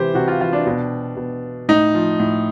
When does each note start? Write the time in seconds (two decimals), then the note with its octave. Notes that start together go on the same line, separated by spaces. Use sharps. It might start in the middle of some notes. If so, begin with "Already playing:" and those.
Already playing: C3 E3 G4 C5
0.14 C3 F#4
0.28 F4
0.41 E3 F4
0.53 D4
0.66 B2 D4
1.17 B2
1.69 A2 D#4
1.94 F3
2.20 A2